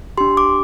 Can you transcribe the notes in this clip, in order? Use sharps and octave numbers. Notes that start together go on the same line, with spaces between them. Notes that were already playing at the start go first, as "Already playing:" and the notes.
D4 G4 C6
D6